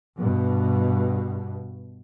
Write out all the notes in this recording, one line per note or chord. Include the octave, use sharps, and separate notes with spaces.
G2 B2